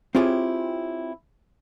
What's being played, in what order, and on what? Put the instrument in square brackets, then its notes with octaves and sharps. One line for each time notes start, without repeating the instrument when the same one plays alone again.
[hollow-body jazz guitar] C4 E4 F4 G4 G#4 C#5